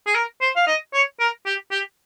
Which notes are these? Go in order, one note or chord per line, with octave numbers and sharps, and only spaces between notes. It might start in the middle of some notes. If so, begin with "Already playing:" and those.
G#4
A#4
C5
F5
D#5
C#5
A#4
G4
G4